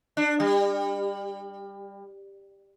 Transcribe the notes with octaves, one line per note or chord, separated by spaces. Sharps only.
D4
G3